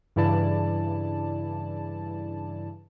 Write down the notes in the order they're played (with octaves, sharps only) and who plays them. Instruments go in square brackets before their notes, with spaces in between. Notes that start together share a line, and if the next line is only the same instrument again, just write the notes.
[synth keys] G2 C#3 E3 E4 D5 A5